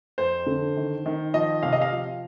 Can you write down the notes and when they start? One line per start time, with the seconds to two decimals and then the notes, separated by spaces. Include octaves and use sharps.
0.18 F2 C5
0.46 D3
0.77 D#3
1.06 D#3
1.34 F3 D#5
1.63 C3 F5
1.73 D#5
1.82 F5
1.92 F3